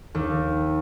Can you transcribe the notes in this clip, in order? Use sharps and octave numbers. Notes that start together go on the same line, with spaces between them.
D#2